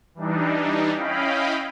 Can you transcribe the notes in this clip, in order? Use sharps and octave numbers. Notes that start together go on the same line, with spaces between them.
E3 G3 D4 D#4
C#4 E4 D#5 F5 G5 B5